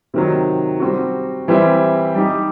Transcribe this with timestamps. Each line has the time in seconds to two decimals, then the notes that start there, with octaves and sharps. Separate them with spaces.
0.14 C3 D#3 F#3
0.80 G3 C4 F#4
1.48 E3 G3 C4 E4
2.15 G3 D#4 G4